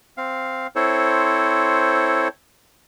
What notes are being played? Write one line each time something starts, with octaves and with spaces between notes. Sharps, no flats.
C4 F5
C4 E4 A4 C5 C#5